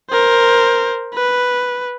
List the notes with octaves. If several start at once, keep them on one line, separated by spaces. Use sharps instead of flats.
A#4 C5
B4